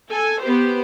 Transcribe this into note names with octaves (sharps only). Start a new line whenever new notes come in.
A4 G#5
B3 G4 C5